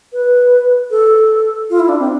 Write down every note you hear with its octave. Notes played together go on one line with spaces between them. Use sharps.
B4
A4
F4
E4
D4
C4